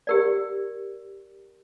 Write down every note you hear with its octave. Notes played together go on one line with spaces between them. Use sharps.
G4 A#4 D5